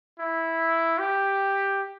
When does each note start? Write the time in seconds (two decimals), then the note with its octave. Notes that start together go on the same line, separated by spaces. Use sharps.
0.19 E4
0.99 G4